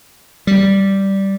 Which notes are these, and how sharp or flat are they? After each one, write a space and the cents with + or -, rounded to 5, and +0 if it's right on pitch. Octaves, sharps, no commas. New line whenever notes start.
G3 -10